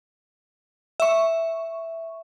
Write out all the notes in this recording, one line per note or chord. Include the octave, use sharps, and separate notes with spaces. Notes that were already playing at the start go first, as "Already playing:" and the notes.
E5 C#6